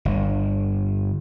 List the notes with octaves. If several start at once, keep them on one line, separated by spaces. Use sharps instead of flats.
G1